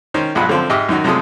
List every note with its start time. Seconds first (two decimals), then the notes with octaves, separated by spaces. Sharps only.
0.14 D#3 C#4 D#4 C5
0.35 B1 G2 F3 G#3 F#5 B5
0.48 F#2 D3 F3 C4
0.70 G#2 G4 D#5 E5 D6 F6
0.89 F#2 D#3 D#4 F#4
1.04 F#2 C3 F3 G#3 A3 D#6